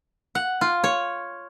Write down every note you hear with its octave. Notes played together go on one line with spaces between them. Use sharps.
F#5
F4
C#5